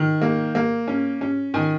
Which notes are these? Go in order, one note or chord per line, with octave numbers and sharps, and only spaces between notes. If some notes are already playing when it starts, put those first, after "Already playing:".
Already playing: D#3
A#3
A#3
C#4
C#4
D#3 G#5